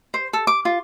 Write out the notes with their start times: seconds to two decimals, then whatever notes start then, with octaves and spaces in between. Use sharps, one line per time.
0.14 C5
0.33 A4
0.47 D6
0.65 F4